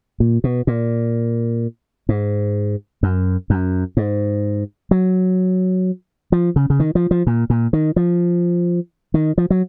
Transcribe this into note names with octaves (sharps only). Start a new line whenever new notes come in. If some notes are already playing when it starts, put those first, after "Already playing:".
A#2
B2
A#2
G#2
F#2
F#2
G#2
F#3
F3
C#3
C#3
D#3
F3
F3
A#2
A#2
D#3
F3
D#3
F3
F#3